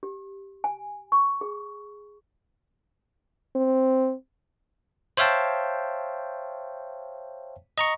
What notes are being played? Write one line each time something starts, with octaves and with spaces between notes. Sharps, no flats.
G4
G#5
C#6
G#4
C4
C5 C#5 E5 F5 G5 A5
D#5 A#5 C#6